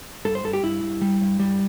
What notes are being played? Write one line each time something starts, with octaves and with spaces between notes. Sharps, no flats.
G2 A4
C5
G2 A4
G4
G2 E4
G2
G3
G2
G3